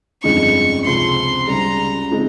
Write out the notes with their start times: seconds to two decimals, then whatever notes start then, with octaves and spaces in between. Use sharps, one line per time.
0.23 G1 F2 C#3 G#3 D#4 C#6
0.85 C#2 C3 F3 C4 C6
1.47 C#2 C#3 G3 A#5
2.10 C#3 F3 G#3 C4 D#4